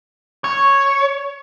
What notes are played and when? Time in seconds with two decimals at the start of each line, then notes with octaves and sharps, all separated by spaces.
0.44 C#5